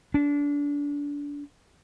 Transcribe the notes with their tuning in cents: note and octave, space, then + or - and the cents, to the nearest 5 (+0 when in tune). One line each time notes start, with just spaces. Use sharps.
D4 -25